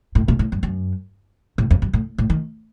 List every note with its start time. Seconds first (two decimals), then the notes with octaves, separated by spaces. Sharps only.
0.15 A2
0.28 A#2
0.39 A2
0.52 F#2
0.63 F#2
1.58 A2
1.71 F2
1.82 F#2
1.93 A2
2.18 A2
2.30 D#3